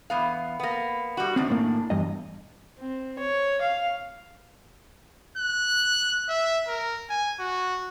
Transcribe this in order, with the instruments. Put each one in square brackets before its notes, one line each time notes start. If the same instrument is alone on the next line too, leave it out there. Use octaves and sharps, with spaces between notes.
[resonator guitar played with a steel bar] E2 B3 F5
A#3 B3
G3 F#4
[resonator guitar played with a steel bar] F#2 D#3 D4 [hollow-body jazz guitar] C4
[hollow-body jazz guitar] A2 A#3
E2 G2 D#5
[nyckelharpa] C4
C#5
F5
[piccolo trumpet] F#6
E5
A#4
G#5
F#4